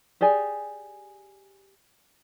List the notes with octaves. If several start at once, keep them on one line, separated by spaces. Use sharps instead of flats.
G4 G#4 D5 G#5